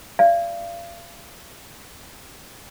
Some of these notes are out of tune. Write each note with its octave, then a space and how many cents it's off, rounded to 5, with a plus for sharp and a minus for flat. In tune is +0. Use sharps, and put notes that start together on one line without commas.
D5 +0 F5 -35